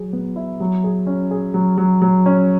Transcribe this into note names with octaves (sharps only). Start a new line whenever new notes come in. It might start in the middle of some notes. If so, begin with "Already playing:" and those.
Already playing: F#3 G#4
B3
E4
F#3
G#4
C#4
G#4
F#3
F#3
F#3
C#4